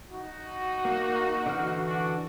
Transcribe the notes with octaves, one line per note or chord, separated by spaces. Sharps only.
D#4 F#4
A#3
D3 E3 F6
D4 F#4